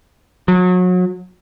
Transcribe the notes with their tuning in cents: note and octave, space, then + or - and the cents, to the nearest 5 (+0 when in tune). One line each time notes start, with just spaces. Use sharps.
F#3 -30